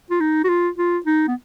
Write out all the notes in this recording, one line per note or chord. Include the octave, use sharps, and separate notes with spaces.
F4
D#4
F#4
F4
F4
D#4
B3